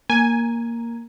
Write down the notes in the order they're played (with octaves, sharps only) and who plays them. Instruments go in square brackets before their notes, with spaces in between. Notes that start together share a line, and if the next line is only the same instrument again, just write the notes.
[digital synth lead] A#3 [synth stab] G#5 G#6